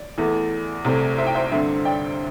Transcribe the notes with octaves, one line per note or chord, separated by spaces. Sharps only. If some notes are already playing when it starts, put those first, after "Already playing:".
Already playing: D5
E2 E3 A3
C2 C3 A3
C5 E5
G5
C5 E5
G2 D3 C4 C5 E5
D5 G5